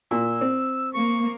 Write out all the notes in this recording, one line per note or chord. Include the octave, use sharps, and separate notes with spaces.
A#2 E6
C4
A#3 C#6